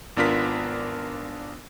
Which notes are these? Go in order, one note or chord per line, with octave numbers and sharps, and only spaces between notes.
G#1 B3 D4 F4 A#4 B6